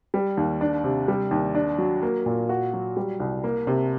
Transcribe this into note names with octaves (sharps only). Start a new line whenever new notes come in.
G3
D#2
D4
C3
G3
D#2
D4
F#3
A#3
A#2
F#4
F#3
G3
C2
A#3
C3